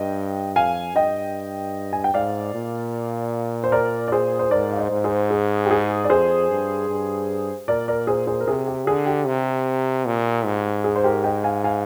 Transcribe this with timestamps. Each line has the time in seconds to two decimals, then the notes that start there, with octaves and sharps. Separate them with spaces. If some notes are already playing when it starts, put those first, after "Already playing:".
Already playing: G2 D#5 G5
0.56 F2 F5 G#5
0.95 G2 D#5 G5
1.93 G#5
2.04 G5
2.14 G#2 D5 F5
2.54 A#2
3.64 C5
3.72 A#4 D5
4.08 D5
4.12 G#4 C5
4.39 C5
4.51 G#2 A#4 D5
4.72 F5
4.79 C5 D#5
4.92 G#2
5.04 G#4 C5
5.30 G#4
5.66 G4
5.71 G#4
6.04 D5
6.10 F2 G#4 C5
6.50 G2
6.89 G2
7.68 A#2 A#4 D5
7.88 A#4 D5
8.07 G#4 C5
8.27 G#4 C5
8.41 A#4
8.47 C3 G#4
8.68 G4
8.87 D3 G#4
9.06 G4
9.26 C3
10.06 A#2
10.45 G#2
10.84 G#4
10.96 C5
11.04 G4 A#4
11.24 D#5 G5
11.44 F5 G#5
11.64 F5 G#5